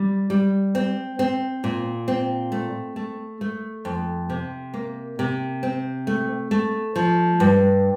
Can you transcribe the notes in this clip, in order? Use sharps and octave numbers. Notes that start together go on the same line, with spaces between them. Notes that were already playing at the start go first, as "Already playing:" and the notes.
Already playing: G3
G3
C4
C4
A#2
C4
A3
A3
A3
F2
C3
A#3
C3
C4
A3
A3
F3
G2